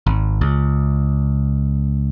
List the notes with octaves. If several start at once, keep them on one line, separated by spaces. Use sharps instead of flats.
G#1
C#2